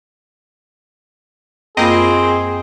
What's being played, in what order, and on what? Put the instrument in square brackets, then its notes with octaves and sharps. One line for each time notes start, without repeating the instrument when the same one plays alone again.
[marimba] F#2 F4 B5 [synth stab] A#3 D#5 [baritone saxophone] C4 [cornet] G#4